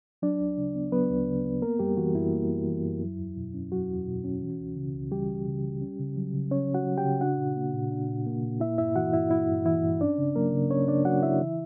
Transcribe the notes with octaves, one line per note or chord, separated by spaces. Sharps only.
F#3 D4 D5
D2
C#3
B3
F#3 B3 B4
D2
C#3
B3
A#3 A#4
F#2 G3 G4
E3 F#4
F#2 E4
A#3
F#2
E3
F#2
F#3
E2
B2
C#4
F#3 F#4
E2
B2
C#4
E3
C#2
C#3
C#2
E3 G3 G4
C#2
C#3
C#2
C#4
C#3
F#3
C#3
C#4 C#5
C#3
F#4 F#5
F#3
G4 G5
C#3
D4 F#4 F#5
A#2
A#3
A#2
D4
A#2
A#3
A#2
A#3 E4 E5
G2 E4 E5
E3 F#4 F#5
G2 E4 E5
A#3 E4 E5
G2
E3 E4 E5
G2
C#4 D4 D5
C#3
F#3 A#3 A#4
C#3
C#4 C#5
C#3 D4 D5
F#3 F#4 F#5
C#3 E4 E5
E3